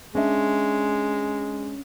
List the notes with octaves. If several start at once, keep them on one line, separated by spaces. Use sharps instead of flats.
G#3 C#4 D4 E5